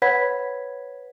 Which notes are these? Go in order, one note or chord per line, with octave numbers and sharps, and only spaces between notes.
B4 C#5 F#5 B5 G#6 B6